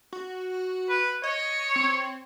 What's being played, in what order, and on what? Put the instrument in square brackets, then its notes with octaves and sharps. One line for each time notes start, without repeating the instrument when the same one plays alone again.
[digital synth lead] F#4
[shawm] B4
[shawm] C#5 [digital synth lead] D#5
[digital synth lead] C4